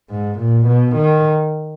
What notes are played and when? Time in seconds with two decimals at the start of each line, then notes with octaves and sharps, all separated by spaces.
0.11 G#2
0.40 A#2
0.67 B2
0.96 D#3